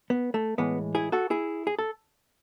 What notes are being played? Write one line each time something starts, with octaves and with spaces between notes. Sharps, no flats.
B3
A3
A2 E3 G#3 B3
E4 G#4
F#4 A4
E4 G#4
G#4
A4